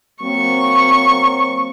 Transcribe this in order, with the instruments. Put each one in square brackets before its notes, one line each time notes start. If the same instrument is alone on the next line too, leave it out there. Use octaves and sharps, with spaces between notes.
[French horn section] F#3 A#3 C4 [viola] C#6